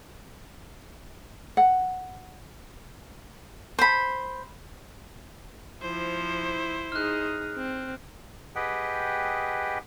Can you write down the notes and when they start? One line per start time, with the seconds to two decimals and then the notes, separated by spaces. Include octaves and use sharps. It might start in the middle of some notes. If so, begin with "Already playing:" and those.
1.57 F#5
3.79 C5 B5
5.82 F3 E4 C5
6.92 D#4 G#4 F6 F#6
7.57 C4
8.55 G4 G#4 B4 D#5 F#5 G5